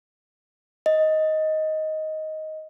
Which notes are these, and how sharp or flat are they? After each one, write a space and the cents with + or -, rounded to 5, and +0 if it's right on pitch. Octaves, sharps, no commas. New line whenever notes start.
D#5 +10